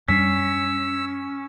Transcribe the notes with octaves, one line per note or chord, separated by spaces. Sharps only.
F#2 G3 C#4 D4 E6 B6 C7